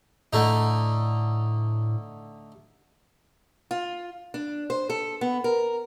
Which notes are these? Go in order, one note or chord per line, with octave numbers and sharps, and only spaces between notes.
A2 D3 A3 D#4
F4
D4
C5
A4
B3
A#4